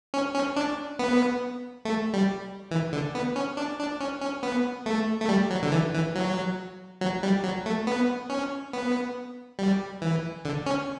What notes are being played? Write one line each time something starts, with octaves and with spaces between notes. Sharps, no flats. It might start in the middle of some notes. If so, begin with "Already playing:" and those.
C#4
C#4
D4
B3
A3
G3
E3
D3
B3
C#4
D4
D4
C#4
C#4
B3
A3
A3
G3
F#3
D3
E3
E3
F#3
F#3
G3
F#3
A3
B3
C#4
B3
G3
E3
D3
C#4